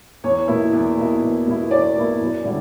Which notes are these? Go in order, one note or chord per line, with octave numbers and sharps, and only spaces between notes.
E2 C#5
B2 A#3 E4
E2
B2 A#3 E4
E2
B2 A#3 E4
E2 D5
B2 A#3 E4
F#2
D3 G3 C#4 E4